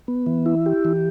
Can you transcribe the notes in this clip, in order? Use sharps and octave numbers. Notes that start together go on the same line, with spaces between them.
B3
E3
E4
G4
E3